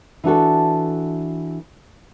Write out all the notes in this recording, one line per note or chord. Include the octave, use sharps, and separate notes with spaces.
E3 D4 F#4 A4